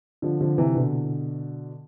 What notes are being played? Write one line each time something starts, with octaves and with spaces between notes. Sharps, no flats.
D3 F3
D3 F3
C3 E3
B2 D3